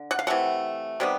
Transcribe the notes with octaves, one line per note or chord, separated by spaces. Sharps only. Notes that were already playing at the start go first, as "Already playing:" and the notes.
Already playing: D3
F#5
F5
C3 E3 A3 F#5
C3 D#3 G3 B3